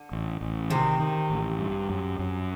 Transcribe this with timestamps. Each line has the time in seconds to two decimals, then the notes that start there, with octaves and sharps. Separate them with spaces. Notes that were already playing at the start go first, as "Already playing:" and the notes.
Already playing: D3
0.12 A1
0.41 A1
0.70 C3 D#3
0.99 D#3
1.30 A1
1.59 G2
1.89 F#2
2.19 F#2